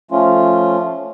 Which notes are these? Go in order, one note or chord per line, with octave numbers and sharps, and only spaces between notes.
F3 A3 C#4 F4